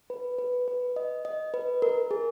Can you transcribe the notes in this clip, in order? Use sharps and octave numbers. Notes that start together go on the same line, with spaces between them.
B4
B4
B4
D#5
D#5
B4
A#4
G#4